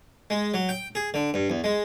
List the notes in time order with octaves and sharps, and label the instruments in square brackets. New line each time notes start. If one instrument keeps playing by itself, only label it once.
[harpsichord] G#3
F#3
G5
G#4
D3
G2
E2
G#3